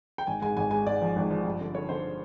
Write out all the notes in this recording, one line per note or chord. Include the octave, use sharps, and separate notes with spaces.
G5
G#1 G#5
G#2 G#5
G#1 G#5
G#3 G#5
G#2 D5
F3
G#1
F3
G2
D3
D3 C#5
D3 C5